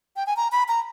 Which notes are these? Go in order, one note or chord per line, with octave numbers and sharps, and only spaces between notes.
G5
G#5
A#5
B5
A#5